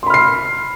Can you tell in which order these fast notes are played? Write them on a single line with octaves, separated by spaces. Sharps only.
C6 B5 F6 C7